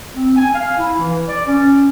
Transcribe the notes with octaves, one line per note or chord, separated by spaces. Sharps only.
C4
G#5
F5
E4
E3
D5
C#4